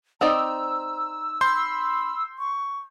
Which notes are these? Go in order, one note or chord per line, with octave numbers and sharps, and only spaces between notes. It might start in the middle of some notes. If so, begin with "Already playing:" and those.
C4 D#4 D5 A#5 E6
B5 C6 G6
C#6